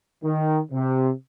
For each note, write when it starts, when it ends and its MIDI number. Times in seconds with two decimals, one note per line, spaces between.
0.23 0.60 51
0.72 1.11 48